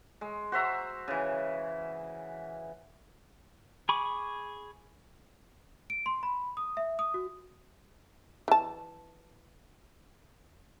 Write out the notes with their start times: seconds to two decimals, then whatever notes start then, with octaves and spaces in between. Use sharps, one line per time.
0.21 G#3
0.52 F#4 C5 E5 A#5
1.08 C#3 E3
3.89 G#4 B5 C#6 D6
5.90 D7
6.06 C6
6.23 B5
6.57 D#6
6.77 E5
6.99 D#6
7.14 F#4
8.48 E3 A5